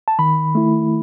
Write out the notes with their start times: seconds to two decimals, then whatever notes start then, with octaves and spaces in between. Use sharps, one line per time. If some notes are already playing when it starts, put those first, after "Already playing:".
0.08 A5
0.19 D#3 B5
0.55 A3 E4